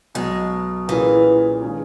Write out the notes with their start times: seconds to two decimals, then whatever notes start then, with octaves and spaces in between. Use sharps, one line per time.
0.15 B1 B2 F#3 G#3
0.88 A#2 E3 A#3 C#4 G#4 B4
1.62 D#3 G#3 C#4